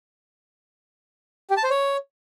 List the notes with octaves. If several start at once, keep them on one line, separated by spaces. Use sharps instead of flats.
G4
A5
C5
C#5